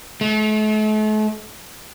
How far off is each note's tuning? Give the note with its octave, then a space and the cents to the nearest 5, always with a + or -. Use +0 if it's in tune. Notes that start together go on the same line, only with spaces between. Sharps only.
A3 -40